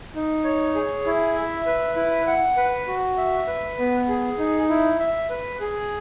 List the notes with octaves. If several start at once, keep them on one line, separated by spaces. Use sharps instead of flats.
D#4
C#5
G#4
E4
E5
B4
E4
F#5
B4
F#4
E5
B4
B3
G#4
D#4
E4
E5
B4
G#4